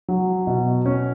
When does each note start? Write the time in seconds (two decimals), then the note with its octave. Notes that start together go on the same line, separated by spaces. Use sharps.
0.08 F#3
0.47 B2
0.86 C#4